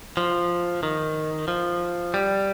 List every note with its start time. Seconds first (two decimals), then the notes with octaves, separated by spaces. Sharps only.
0.17 F3
0.83 D#3
1.48 F3
2.14 G3